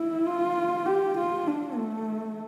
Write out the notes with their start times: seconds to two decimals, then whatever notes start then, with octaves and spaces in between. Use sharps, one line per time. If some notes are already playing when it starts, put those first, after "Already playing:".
Already playing: E4
0.26 F4
0.86 G4
1.17 F4
1.47 D4
1.77 A3